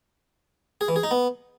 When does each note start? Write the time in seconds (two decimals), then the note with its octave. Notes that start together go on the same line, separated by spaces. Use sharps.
0.81 G#4
0.88 E3
0.96 G#4
1.03 D#4
1.11 B3